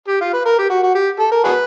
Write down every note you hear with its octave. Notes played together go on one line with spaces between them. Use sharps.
G4
F4
B4
A#4
G4
F#4
F#4
G4
A4
A#4
F#4 G#4 B4